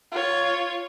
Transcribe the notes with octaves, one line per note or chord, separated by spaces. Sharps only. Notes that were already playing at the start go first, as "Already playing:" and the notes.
F4 C#5